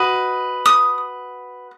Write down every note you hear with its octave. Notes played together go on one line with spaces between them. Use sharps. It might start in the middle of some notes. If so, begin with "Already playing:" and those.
Already playing: F#4 B4 D#5
D#6